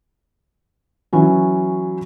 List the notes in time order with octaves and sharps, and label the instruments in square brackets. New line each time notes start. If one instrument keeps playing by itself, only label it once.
[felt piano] E3 F#3 C#4